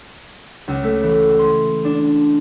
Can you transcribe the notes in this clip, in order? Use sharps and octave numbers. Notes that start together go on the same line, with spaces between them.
C#2
A3
E3
C6
D4